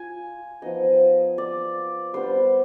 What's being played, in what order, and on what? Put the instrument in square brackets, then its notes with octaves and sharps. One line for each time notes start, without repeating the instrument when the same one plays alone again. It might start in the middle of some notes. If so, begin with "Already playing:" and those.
Already playing: [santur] F4 G#5
F3 B3 D#4 D#5
D5
G3 B3 D4 C5